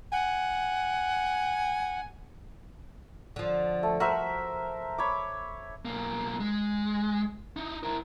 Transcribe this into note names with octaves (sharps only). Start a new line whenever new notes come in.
F#5 G#5
D3 F3
A3
F#4 A#4 C5 E5
C#5 B5 D6
B1 A#3
G#3
D#4 E4
E4 A#4